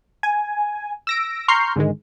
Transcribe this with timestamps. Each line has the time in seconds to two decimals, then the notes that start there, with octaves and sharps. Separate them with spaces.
0.23 G#5
1.07 E6 A#6 D7
1.48 A#5 C6 C#6 F6 G6 C7
1.76 G#2 D3 D#3 G#3